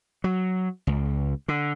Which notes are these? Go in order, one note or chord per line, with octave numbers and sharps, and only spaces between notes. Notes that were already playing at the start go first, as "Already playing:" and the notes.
F#3
C#2
D3